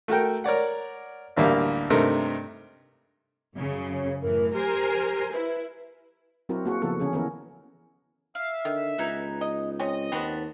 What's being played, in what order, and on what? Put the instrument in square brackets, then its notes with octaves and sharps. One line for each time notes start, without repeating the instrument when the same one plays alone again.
[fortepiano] A3 F#4 A4 A#4 G5
A#4 C#5 D5 F#5
A1 D2 G3 A#3 E5 F5
G2 C3 A3 D#4 A#4
[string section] F#2 C#3
[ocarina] C#5
[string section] F#2 A2 E3 [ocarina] A#4
[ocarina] G4 [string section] A#4 C5 G#5
[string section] E4 [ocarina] B4
[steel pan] F#3 C4 E4 F#4 A#4
A#3 F#4 G#4
C#3 F3 B3 E4 F#4 A4
D3 C#4 G#4
E3 B3 C#4 E4 A#4
[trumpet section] E5 [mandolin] F5
[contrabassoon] D3 [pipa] D#3
[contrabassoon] C#2 [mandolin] B3 D#4 G#5
[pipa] D#5
[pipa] C4 C#4 [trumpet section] D#5
[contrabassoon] D#2 [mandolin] B3 D4 B5 [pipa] C4 F#4